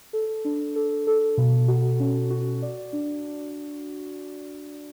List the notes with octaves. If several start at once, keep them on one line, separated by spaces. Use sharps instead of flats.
A4
D4
A4
A4
B2
F#4
C#4
F#4
D5
D4